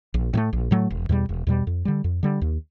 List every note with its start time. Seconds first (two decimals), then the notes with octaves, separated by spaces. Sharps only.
0.14 A#1
0.33 A2 F#3 A3
0.53 A#1
0.71 A2 F#3 A3
0.90 E1
1.09 E2 B2 G3
1.29 E1
1.47 E2 B2 G3
1.67 F2
1.85 D3 G3
2.04 F2
2.23 D3 G3
2.42 D#2